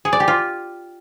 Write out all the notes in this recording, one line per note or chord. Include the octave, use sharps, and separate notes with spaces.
G#4
D5
G4
F4